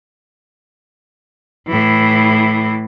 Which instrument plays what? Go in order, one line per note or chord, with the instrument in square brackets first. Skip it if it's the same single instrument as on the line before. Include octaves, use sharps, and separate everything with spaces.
[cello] A2 E3